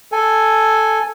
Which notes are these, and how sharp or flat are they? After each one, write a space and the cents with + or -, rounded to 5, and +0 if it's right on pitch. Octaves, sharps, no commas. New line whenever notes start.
A4 +0 G#5 +0